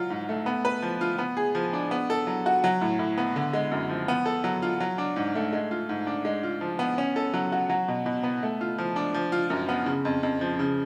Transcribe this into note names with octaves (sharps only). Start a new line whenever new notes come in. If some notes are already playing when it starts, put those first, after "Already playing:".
Already playing: F#3 F4
G#2
A3
B3
B4
F3
F4
B3
G#4
F3
D4
B3
A4
F#3
F#4
F#3
A2
A2
B3
D3
G#3
F#2
F3
B3
A4
F#3
F4
F#3
D4
G#2
A3
G#3
F4
G#2
D4
G#3
F4
F3
B3
C#4
A4
F#3
F#4
F#3
B2
B2
B3
A3
F4
F3
D4
F3
F4
F#2
B3
C#3
F2
F2
F3
C#3